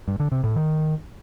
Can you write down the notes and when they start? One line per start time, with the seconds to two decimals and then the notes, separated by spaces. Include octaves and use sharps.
0.08 G2
0.20 D3
0.32 C3
0.44 A2
0.56 D#3